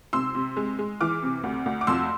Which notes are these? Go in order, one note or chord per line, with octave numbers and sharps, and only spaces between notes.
C3 C6 E6
C3
G#3
G#3
E3 D6 F6
C3
D2
D2
D6
F2 C6 E6